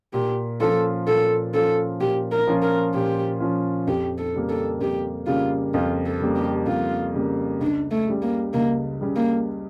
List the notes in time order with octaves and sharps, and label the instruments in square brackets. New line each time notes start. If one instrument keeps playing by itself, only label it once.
[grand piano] A#2 [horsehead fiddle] G4
[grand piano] F3 C#4 F4 [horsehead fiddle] A4
[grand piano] A#2 [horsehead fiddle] A4
[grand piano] F3 C#4 F4 [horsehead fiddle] A4
[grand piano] A#2 [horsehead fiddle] G4
[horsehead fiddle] A#4
[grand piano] F3 C#4 F4
[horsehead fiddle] A#4
[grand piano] A#2 [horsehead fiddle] G4
[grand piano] F3 C#4 F4
[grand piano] F2 [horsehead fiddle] G4
[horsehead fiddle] A4
[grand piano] C#3 G3 A#3
[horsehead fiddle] A4
[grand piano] F2 [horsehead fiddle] G4
[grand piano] C#3 G3 A#3 [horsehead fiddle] F4
[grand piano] F2 [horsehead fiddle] F4
[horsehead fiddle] A4
[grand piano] C#3 G3 A#3
[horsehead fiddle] G4
[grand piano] F2 [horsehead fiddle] F4
[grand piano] C#3 G3 A#3
[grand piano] C#2 [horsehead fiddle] D4
[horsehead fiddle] A3
[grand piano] C#3 G3
[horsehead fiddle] A#3
[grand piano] C#2 [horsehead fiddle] A#3
[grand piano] C#3 G3
[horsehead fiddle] A#3